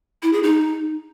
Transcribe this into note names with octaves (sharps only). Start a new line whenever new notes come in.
E4
G#4
D#4